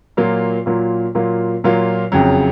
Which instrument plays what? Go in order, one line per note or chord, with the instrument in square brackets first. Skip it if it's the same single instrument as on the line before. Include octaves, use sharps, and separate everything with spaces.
[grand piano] A#2 F#3 A#3 F4
A#2 F#3 A#3 F4
A#2 F#3 A#3 F4
A#2 F#3 A#3 F4
F#1 F2 C#3 F#3